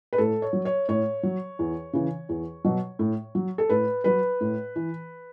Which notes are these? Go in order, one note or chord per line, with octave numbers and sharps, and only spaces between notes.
B4
A2 A4
C#5
F#3
C#5
A2 C#5
F#3
E2
C#3 E3
E2
B2 F#3
A2
F#3
A4
A2 B4
F#3 B4
A2
E3